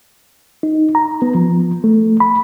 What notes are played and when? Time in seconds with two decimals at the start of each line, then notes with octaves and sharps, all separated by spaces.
0.63 D#4
0.95 A#5
1.22 B3
1.35 F3
1.84 A3
2.20 B5